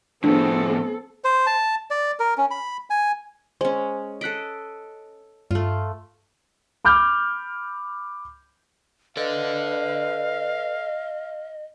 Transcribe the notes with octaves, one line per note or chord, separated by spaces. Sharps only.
A2 F3 B3 C4 D4 G#4 A4
C5
A5
D5
A#4
C#4
B5
G#5
G#3 C#4 C5
A4 D#5 F#6 B6 D7
G2 A3 F4
B5 D6 F6 G6
A4 B4 D5 D#5 F5